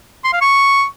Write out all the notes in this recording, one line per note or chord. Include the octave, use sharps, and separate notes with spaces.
C6
F5
C#6